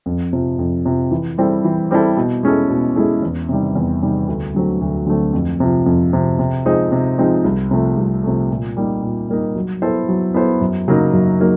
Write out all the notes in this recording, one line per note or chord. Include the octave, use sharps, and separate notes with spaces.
F2
C3 F3
F2
C3 F3
E3
G3 C4 E4 A4
E3
G3 C4 E4 A4
B2
G#3 C#4 E4 A4
B2
G#3 C#4 E4 A4
E2
C3 D#3 G3
E2
C3 D#3 G3
D2
D3 F#3 A3 C4
D2
D3 F#3 A3 C4
F2
C3 F3
F2
C3 F3
C3
F3 G#3 C4 D#4
C3
F3 G#3 C4 D#4
C2
C3 F3 A3
C2
C3 F3 A3
A#2
G3 A#3 D#4
A#2
G3 A#3 D#4
F#3
B3 E4 A4 C5
F#3
B3 E4 A4 C5
F#2
C#3 F#3 A#3 D#4
F#2
F#3 A#3 D#4